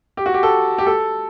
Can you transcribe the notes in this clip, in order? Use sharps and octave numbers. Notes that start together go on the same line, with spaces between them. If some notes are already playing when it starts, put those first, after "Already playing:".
G4
F#4
G4
A4
G4
A4